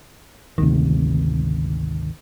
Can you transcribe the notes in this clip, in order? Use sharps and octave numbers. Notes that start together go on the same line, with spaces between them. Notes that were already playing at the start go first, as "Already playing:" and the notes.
G#1 D2 C3 D#3